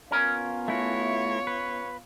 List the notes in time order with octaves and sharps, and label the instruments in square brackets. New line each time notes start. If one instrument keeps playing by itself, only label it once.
[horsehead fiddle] B3 F4 [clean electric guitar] C#4 A#4
[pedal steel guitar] A3 E4 F#4 [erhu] C#5
[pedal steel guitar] B4